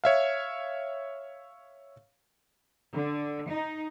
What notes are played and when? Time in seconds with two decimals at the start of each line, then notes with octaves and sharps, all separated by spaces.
0.04 C#5 E5 F5
2.95 D3
3.50 D#4